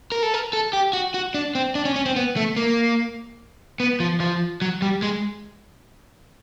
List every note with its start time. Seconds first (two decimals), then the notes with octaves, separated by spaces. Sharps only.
0.12 A#4
0.23 A4
0.34 A#4
0.53 A4
0.73 G4
0.93 F#4
1.14 F#4
1.34 D4
1.55 C4
1.75 D4
1.85 C#4
1.96 C#4
2.06 C4
2.16 B3
2.36 A3
2.57 A#3
3.80 B3
4.00 F3
4.20 F3
4.62 F#3
4.82 G3
5.02 G#3